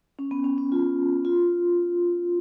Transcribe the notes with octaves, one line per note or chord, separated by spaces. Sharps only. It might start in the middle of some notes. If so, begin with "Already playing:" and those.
C#4
B3
C#4
C#4
F4
F4